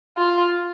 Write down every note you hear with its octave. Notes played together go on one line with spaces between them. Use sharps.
F4